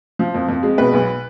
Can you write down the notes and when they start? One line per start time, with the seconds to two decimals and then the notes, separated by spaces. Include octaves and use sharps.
0.19 F3
0.34 F2
0.48 F2
0.63 G#3
0.78 B2 B4
0.93 B1